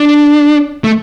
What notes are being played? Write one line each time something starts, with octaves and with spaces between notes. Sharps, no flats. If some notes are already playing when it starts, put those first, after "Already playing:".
Already playing: D4
A3